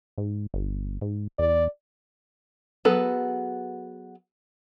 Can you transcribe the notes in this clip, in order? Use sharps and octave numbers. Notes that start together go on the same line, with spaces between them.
G#2
G1
G#2
E2 D5
F#3 B3 G#4 A4 B4